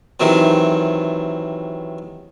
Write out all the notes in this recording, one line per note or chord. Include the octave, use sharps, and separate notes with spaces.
C3 D#3 E3 F#3